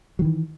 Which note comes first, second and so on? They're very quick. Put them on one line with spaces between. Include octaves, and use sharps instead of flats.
F#3 D#3 E3